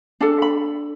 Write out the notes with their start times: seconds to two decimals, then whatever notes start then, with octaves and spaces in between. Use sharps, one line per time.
0.21 D4 A4 A5
0.42 B5